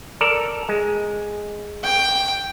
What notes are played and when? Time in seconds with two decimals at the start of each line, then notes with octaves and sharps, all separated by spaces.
0.21 A4 A#4 D5
0.69 G#3
1.84 G5